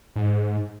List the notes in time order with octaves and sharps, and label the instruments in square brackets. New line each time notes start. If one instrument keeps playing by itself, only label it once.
[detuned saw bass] G#2